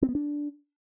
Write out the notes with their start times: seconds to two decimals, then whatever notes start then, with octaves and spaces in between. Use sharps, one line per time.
0.02 C4
0.09 B3
0.15 D4